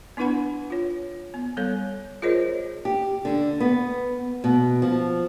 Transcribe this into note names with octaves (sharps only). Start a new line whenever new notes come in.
B3 D4 E4 B4 F#5 B5
F4 C#5
B3
G3 B3 A4 C#5
F4 G#4 A#4 C5 C#5 D#5
G4
D3
B3
B2
F3